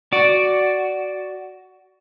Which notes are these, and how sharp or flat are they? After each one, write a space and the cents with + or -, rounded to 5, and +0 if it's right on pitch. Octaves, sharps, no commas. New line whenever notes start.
F#4 +10 D5 +0